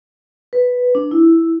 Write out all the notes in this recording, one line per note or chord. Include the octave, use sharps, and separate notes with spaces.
B4
D4
E4